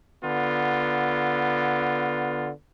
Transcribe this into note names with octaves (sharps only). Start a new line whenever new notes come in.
D3 B3 F4